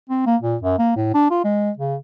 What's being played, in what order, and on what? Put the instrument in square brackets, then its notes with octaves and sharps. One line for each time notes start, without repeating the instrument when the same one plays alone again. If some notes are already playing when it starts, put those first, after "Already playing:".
[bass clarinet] C4
A#3
A#2
F#2
A#3
A2
D4
F4
G#3
C#3